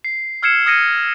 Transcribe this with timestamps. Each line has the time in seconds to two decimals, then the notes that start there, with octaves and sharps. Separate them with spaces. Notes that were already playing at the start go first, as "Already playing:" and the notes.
0.04 C7
0.43 E6 F6 G#6 C7 C#7 E7
0.66 D#6 F6 G#6 A#6 C#7 D#7